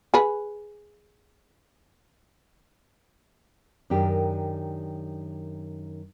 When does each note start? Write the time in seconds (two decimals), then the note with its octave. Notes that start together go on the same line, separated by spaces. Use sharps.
0.14 G#4 B4
3.90 F#2 D#3 D4 G4 A#4